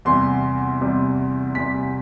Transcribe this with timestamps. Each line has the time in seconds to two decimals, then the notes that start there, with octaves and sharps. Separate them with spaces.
0.05 E2 C3 G3 C6
0.81 E2 C3 G3
1.55 E2 C3 G3 B6